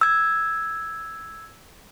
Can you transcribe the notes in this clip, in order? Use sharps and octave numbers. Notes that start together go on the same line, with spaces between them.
E6 G#6